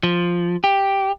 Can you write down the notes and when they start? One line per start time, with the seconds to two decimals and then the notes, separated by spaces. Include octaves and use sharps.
0.03 F3
0.64 G4